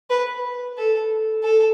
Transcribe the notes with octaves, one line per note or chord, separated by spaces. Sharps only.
B4
A4
A4